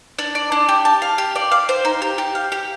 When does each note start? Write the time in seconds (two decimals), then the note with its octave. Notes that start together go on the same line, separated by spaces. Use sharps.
0.19 D4
0.35 D5
0.52 D4
0.69 G4
0.85 A5
1.02 F5
1.18 G4
1.35 D5
1.51 F5
1.69 C5
1.85 D#4
2.02 G4
2.18 G4
2.35 F5
2.52 G4